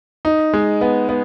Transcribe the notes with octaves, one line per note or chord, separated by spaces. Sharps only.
D#4
G#3
B3
B3